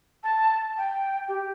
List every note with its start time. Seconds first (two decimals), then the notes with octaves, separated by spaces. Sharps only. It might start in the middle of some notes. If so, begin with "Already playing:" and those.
0.24 A5
0.78 G5
1.28 G4